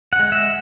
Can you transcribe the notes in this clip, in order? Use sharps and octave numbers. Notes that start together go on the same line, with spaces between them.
F#5
G#3
E5